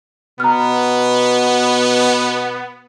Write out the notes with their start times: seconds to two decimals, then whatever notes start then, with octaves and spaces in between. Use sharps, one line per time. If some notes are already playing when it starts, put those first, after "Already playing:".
0.40 B2 B3 A#5 F6